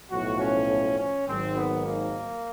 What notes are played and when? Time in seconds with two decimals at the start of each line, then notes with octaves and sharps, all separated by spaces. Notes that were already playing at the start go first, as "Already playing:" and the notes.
0.11 B1 A2 F3 F#4
0.40 C#4
0.99 C#4
1.27 G#1 G#2 D#3 F#3 C4
1.56 B3
1.86 A#3